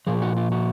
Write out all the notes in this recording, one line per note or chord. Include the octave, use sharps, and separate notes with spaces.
A#2 F3 G#4
F#4
F4
F#4